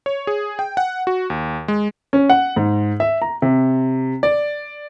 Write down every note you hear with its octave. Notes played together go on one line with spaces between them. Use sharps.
C#5
G#4
G5
F#5
F#4
D#2
G#3
C#4
F#5
G#2
E5
A#5
C3
D5